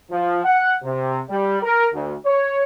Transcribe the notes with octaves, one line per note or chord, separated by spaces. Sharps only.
F3
F#5
C3
G3
A#4
D2
C#5